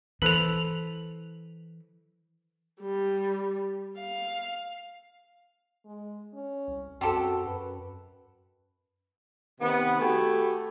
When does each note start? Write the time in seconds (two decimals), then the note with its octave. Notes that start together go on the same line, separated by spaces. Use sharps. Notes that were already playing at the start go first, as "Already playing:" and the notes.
0.22 E3 A4 B4 C5 F7 F#7
2.80 G3
3.98 F5
5.85 G#3
6.33 C#4
6.67 C2
7.01 F#2 C4 F#4 G4 A4
7.45 F#2 B4
9.61 C3 D#3 B3
10.00 A3 F#4 G4 G#5 B5